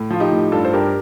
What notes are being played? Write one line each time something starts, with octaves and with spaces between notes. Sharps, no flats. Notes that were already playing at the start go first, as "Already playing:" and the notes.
Already playing: A2
F3 F4
D#4 G4
A2
G2 F4 A4
C5
G2 G4 A#4